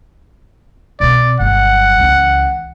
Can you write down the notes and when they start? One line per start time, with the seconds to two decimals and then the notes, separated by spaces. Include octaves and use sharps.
1.00 B2 C4 D5
1.40 G1 F#3 F#5
2.00 C#2 E3